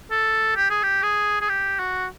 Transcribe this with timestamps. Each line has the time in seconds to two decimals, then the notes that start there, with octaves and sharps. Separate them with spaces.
0.11 A4
0.56 G4
0.70 G#4
0.83 G4
1.03 G#4
1.41 G#4
1.49 G4
1.79 F#4